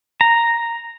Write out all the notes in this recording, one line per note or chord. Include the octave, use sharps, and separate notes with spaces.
A#5